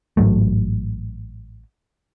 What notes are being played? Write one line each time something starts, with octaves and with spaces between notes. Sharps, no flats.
A1 G#2 F#3 A3